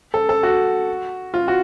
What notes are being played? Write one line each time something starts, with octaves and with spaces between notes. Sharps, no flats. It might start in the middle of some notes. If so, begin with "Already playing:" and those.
A4
A4
F#4
F4
F#4